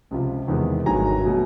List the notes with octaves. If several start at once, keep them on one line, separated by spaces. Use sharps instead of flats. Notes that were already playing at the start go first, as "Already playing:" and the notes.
C#2 C3 F3
E2 C3 D#3 G#3
G#1 G2 D#3 F#3 A3 G#5 A#5
B2 F#3 A3